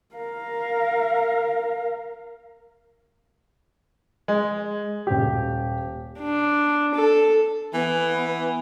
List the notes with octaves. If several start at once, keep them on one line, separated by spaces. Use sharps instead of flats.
A#4 F5
G#3
D#1 G4
D4
A4
E3 B3